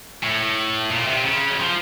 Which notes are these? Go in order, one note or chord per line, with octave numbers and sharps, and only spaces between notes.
A2
A#2
C3
C#3
F#3
F3